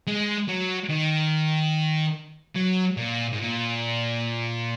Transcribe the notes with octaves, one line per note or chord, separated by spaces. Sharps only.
G#3
F#3
D#3
F#3
A#2
G#2
A#2